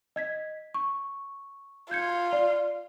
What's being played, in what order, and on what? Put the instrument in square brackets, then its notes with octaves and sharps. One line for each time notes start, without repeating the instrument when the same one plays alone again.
[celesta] D#5 G#6 B6
C#6
[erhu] F4 [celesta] G6 G#6 C#7
[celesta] D5